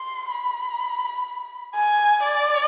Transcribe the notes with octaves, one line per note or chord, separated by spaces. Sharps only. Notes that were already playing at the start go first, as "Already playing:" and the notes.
Already playing: C6
B5
G#5
D5